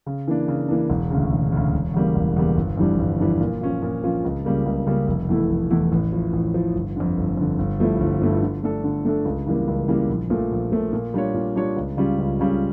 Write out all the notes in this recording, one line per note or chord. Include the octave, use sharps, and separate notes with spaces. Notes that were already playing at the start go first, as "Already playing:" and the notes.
C#3
E3 A#3 D4
C#3
E3 A#3 D4
E1
D2 C#3
E1
D2 C#3
E1
E2 C#3 G3 A#3
E1
E2 C#3 G3 A#3
G1
F2 E3 G3 D4
G1
F2 E3 G3 D4
A#2
F3 C#4 F4
A#2
F3 C#4 F4
C#2
C#3 G3 A#3
C#2
C#3 G3 A#3
F1
E2 E3 A3 E4
F1
E2 E3 A3 E4
A1
A2 F3
A1
A2 F3
G1
F2 D3
G1
F2 D3
G1
G2 F3 A3 E4
G1
G2 F3 A3 E4
D3
A3 D4 A4
D3
A3 D4 A4
C#2
C#3 E3 G3 A#3
C#2
C#3 E3 G3 A#3
A#1
A#2 F3 A3
A#1
A#2 F3 A3
A#2
G3 D4 F4 C#5
A#2
G3 D4 F4 C#5
C#2
C#3 G3 C#4 F4
C#2
C#3 G3 C#4 F4